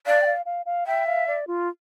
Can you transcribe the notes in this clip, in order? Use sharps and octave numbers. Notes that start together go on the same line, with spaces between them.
D5 F5
G5
F5
F5
F5
E5 G5
F5
D5
F4